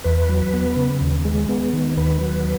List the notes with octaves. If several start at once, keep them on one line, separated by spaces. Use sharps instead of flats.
E2 B4
F#3
B3
C#3
D#2
G#3
B3
D#3
D#2 B4
F#3